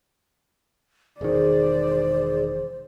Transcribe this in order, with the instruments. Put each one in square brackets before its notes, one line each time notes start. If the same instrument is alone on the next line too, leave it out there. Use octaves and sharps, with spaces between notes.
[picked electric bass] E1 D#3 [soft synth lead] G#4 [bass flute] C5 [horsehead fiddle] D5